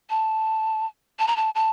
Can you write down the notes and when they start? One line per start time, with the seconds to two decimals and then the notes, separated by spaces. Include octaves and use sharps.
0.10 A5
1.19 A5
1.28 A#5
1.37 A5
1.55 A5